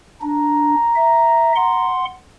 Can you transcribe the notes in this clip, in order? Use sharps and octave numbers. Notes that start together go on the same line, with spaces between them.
D4 A#5
E5
F#5 C6